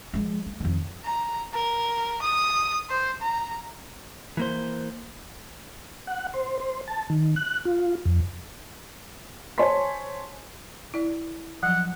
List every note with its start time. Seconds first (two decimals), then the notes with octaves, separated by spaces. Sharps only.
0.13 F3 G#3
0.46 A3
0.60 F2 D#3
1.05 A#5
1.54 A#4
2.22 D#6
2.90 C5
3.22 A#5
4.37 E3 A#3 C5
6.07 F#5
6.34 C5
6.60 C5
6.88 A5
7.10 D#3
7.36 F#6
7.65 F4
8.06 F2
9.58 C5 C#5 G#5 A5 C6 B6
10.94 E4 D5
11.63 F3 F#3 F#5